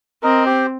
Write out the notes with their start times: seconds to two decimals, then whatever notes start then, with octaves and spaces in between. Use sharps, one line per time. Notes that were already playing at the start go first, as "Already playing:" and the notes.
0.23 C4 A#4 D#5
0.46 G4 C5